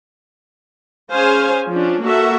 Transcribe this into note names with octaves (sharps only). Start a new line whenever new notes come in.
C#4 G#4 C5 F5 G#5
F3 C#4 D4
A#3 F#4 A4 E5